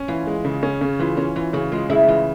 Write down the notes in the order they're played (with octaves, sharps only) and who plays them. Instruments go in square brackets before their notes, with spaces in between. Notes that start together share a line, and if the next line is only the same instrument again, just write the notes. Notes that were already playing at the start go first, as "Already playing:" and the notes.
Already playing: [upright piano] C#4
[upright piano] E3 [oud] F4
[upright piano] G#3
C#3
C#4
C#3
[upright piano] E3 [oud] F4
[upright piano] C#4 [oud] F4
[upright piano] E3 [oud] F4
[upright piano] C#3 [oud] F#4
[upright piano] G#3 [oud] F4
[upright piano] C#3 [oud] E4
[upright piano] E3 [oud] F4